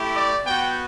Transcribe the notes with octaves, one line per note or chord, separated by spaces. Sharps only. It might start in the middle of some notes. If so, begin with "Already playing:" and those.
Already playing: A3 E4 G4
D5
B3 F#4 G5